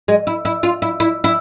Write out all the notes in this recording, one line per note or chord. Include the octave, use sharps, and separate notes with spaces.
G#3
E4
E4
F4
E4
E4
E4